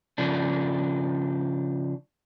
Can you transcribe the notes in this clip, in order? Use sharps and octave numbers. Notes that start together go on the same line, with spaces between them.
C#3 F3 D4